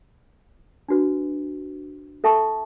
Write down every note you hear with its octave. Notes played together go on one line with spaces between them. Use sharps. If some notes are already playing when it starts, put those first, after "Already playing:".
D4 F#4 B4
A4 E5 A5 C#6